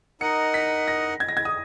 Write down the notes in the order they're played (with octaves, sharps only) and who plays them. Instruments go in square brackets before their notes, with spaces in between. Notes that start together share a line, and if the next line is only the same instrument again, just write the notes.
[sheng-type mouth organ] D#4 A#4 D#5 F#5 [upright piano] C#7
[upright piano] B6
A#6
G#6
A#6
G#6
D#6